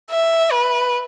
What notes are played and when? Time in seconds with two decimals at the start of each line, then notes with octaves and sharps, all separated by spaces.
0.11 E5
0.52 B4